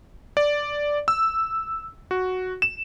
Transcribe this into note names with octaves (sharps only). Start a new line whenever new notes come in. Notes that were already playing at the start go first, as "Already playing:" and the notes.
D5
E6
F#4
E7